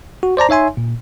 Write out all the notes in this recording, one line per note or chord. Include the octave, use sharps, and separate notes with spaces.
F#4
C5 D5 A5 A#5
D#4 C#5 E5 G#5 C6
A#2